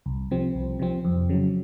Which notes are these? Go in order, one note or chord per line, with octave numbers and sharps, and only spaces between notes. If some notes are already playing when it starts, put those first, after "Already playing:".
C2
C3 F3 C4
C2
C3 F3 C4
F2
C#3 F#3